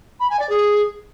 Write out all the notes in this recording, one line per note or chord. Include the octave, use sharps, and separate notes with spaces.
B5
G#5
D5
G#4